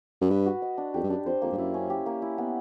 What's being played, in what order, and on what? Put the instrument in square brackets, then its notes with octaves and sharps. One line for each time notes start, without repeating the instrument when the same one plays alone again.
[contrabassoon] F#2
[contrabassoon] G2 [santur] B4
[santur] F#4
D#5
D4
[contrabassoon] F2 [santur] G4
[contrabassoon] G2
[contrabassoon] F#2 [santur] D4
[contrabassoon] F2 [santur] C5
[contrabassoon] F2 [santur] A#3
[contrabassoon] G2
[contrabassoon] F#2 [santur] E4
[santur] C#4
G4
A#3
E4
B3